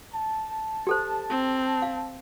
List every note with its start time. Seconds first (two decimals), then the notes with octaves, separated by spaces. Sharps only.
0.14 A5
0.87 G4 A4 C5
1.30 C4
1.82 F5